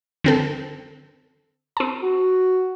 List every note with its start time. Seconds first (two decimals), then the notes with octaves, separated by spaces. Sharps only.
0.24 D3 C4 A4
1.77 C4 A5
2.02 F#4